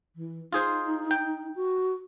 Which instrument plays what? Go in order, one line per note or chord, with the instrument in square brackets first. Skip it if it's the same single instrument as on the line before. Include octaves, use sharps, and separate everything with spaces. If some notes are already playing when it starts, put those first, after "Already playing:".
[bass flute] E3
[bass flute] D#4 [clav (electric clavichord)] F4 G#4 C5
[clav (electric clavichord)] G5
[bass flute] F#4